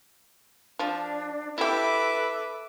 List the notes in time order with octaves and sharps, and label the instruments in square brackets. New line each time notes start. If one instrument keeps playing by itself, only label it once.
[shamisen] F3 [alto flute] D4
[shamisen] E4 G4 [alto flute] A4 [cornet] B4 [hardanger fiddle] E5 D6